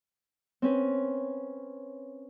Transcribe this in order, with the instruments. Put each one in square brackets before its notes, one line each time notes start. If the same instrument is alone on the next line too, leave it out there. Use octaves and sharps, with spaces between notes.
[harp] C4 C#4 B4